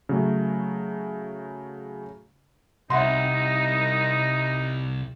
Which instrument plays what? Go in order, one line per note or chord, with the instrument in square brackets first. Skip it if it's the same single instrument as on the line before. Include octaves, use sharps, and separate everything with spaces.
[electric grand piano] C#3 F#3 A3
[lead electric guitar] C2 [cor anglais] D#4 [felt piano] E5 F#5 C6